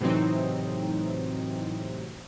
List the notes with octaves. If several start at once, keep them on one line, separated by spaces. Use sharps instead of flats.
A2 C3 E3 F#3 C4 D#4